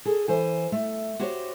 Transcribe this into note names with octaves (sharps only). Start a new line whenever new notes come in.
G#4 A4
E3 C5 G#5
A3
F#4 G4 C5 C#5